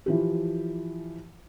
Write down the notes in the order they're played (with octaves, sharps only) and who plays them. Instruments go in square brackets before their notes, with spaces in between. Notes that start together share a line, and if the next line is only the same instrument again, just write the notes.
[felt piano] E3 F3 G4